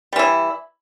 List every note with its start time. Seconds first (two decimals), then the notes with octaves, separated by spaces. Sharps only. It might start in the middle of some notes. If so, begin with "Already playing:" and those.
0.13 G3
0.16 E3
0.19 E4